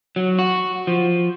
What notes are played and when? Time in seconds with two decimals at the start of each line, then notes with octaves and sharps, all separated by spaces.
0.16 F#3
0.38 F#4
0.87 F3